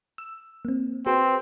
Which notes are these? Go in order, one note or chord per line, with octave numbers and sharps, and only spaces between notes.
E6
A#3 C4
C4 F#4 G#4 B4